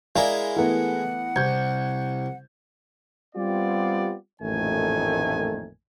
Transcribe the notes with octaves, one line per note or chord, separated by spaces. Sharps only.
G#3 E4 A#4 D5 F5 G#5
E3 A3 B3 F#5
C2 G6 G#6
G3 B3 C4 F4 G4 D5
A1 F2 A#2 D#3 A3 G#5